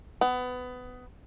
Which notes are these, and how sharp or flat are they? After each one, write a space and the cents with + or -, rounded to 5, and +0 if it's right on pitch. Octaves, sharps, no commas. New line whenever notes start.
B3 +20